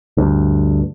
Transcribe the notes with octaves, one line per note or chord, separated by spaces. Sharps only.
D2 G2